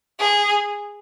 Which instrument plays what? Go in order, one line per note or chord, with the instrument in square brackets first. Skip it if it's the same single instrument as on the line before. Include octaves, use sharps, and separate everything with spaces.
[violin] G#4